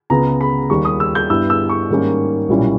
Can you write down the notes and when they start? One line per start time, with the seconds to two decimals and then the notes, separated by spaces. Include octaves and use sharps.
0.10 C#2 C#3 G#3 B3 A#5
0.41 B5
0.70 D#2 D#3 G3 C#6
0.85 D#6
1.00 E6
1.15 G6
1.30 G2 G3 B3 E4 E6
1.50 E6
1.69 C#6
1.90 G#2 D#3 G3 A#3 C#4
2.49 B1 A#2 G3 C#4 E4